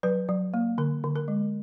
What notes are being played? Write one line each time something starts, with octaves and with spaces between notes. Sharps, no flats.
F#3 B4
F#3
A#3
D3 A#4
D3
A#4
G#3